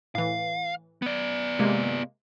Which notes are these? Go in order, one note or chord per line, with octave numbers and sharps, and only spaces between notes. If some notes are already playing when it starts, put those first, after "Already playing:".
A2 E3 F5
B3 D5
C3 G#3 A#3